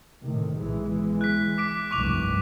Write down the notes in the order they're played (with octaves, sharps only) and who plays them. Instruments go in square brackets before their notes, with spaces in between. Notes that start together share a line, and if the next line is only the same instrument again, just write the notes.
[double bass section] A2 C3 D#3
B1 E3 G#3
[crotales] F#6 B6
D6 B6 D7
[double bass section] F1 C2 G2 [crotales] C#6 D6 F7